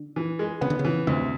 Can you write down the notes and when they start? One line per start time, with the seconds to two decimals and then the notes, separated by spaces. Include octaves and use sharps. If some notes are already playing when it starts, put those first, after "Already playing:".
Already playing: D3
0.16 E3
0.39 G#3
0.61 C#3 B3
0.70 D3
0.79 C#3
0.85 E3
1.07 D2 C3